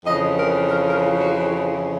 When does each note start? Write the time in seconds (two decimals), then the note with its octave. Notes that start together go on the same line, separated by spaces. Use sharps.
0.05 F2 C#3 E3 D#5
0.38 A#4
0.71 A#4
0.87 A#4
1.04 F4
1.20 F#4